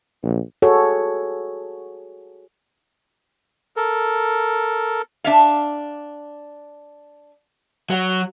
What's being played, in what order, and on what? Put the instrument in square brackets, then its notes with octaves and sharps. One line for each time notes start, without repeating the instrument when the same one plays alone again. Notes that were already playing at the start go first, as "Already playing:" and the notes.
[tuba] A#1
[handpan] F#4 G#4 A4 C#5
[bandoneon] A4 A#4
[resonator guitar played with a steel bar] D4 E5 F5
[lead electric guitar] F#3